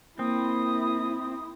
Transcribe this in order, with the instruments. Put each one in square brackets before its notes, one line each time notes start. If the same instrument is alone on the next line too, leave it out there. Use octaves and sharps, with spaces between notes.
[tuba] A#3 [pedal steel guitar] C4 [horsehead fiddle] E4 [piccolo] D#6